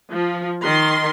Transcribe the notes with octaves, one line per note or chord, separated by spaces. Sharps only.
F3
D#3 C6